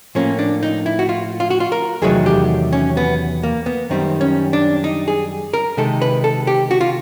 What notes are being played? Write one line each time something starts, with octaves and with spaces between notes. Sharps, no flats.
A2 F3 A#3 C#4
D4
D#4
E4
F#4
F4
F4
F#4
F4
A#4
E2 C3 D#3 F#3 A3 G#4
G4
C#4
B3
A#3
B3
F#2 D#3 G3 C4
C#4
D4
D#4
G#4
A#4
C3 D#3 G#3 A4
B4
A4
G4
F#4
F4